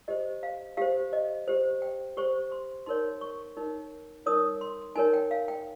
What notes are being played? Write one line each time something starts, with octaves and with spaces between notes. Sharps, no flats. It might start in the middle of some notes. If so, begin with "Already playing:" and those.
G4 C5 D#5
F5
G4 C5 F5
D#5
G4 C5
G5
G4 C5 C#6
C6
D#4 A#4 C#5 C6
C#6
D#4 A#4 C#5
D#4 A#4 C#5 D#6
C6
D#4 A#4 C#5 G#5
G5
F5
G5